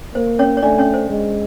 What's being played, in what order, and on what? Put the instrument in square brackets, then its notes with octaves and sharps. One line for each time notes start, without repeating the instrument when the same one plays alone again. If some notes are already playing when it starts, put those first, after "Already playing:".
[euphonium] A#3 [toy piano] C5
[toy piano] C#4 C#5
C#5
[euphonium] A3 [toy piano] D4 D5
[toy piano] C#4 C#5
C5
[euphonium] G#3